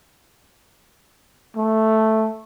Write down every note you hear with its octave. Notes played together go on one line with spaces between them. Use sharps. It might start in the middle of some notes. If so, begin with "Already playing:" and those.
A3